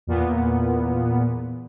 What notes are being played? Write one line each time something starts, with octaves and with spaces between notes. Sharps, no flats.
E2 A#2 B3